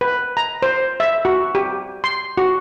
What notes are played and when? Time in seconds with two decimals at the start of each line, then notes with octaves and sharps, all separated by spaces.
0.01 B4
0.37 A#5
0.62 C5
1.00 E5
1.25 F#4
1.55 G4
2.04 C6
2.37 F#4